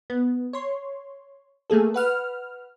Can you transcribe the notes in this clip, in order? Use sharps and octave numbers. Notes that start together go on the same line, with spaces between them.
B3
C#5 C6
A3 A#3 G#4 A4
B4 F#5 F6